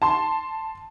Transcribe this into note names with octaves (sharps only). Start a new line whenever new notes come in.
A5 C6